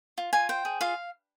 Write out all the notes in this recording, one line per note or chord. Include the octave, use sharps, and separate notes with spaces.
F4
F4 G#5
C5 G5
G#4
F4 F5